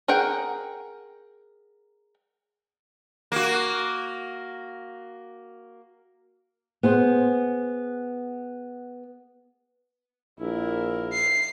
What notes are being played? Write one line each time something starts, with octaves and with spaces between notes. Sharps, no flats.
G#4 A#4 F#5 G5
A#3 F#4
B3 G#4 C5
A#1 E4 A#4
C7